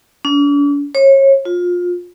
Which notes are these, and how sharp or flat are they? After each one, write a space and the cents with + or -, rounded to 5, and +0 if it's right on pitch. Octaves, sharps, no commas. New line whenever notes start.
D4 -45
C#5 -30
F4 +25